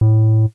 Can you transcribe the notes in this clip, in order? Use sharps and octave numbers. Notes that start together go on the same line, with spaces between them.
A2